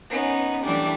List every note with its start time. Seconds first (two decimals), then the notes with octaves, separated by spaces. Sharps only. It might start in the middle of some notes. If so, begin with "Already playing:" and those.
0.11 B3 C#4 D#4
0.65 E3 G3 A3 D4